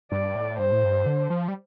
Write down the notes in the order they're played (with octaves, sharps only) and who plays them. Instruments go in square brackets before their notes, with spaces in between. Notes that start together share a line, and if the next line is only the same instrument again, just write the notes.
[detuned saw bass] G2 [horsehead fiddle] D5
[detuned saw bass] A2
[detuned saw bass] G2 [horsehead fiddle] C5
[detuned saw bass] A2
G2
D3
F3
G3